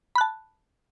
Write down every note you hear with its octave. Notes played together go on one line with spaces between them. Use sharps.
A5 B5 F#6